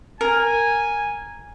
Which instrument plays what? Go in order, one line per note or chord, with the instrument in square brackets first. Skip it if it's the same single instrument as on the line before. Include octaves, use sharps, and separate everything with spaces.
[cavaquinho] A#4 [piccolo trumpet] G#5